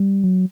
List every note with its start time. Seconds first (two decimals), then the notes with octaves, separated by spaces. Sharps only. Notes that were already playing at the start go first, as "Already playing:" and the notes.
Already playing: G3
0.24 F#3